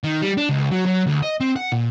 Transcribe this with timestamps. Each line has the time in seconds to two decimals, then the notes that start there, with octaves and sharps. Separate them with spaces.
0.04 D#3
0.22 G3
0.37 D4
0.49 C#2
0.71 F#3
0.86 F#3
1.06 D2
1.23 D#5
1.40 C4
1.56 F#5
1.72 A#2